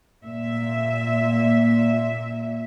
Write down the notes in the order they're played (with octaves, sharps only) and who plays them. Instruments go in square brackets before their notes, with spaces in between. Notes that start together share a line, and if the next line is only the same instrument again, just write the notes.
[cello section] A#2 E5